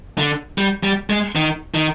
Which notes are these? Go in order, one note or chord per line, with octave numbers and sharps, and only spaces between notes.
D3
G3
G3
G#3
D#3
D#3